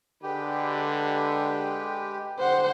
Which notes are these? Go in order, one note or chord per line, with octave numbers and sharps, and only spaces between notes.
D3 G#3 G4 B4
D3 G3 C5 F#5